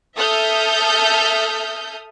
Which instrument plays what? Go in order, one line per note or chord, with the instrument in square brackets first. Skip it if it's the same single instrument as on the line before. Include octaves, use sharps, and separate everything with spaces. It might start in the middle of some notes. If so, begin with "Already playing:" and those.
[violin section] A4 E5 D#6 F6 G6